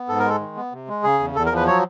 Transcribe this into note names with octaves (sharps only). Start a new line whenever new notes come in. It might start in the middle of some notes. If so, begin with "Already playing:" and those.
Already playing: B3
G#2 A4
A#4
G#3 A4
D#3
B3
C3
G#3
C#3 G#4
E2
E2 A4
A#4
F3
B4
F#3 C#5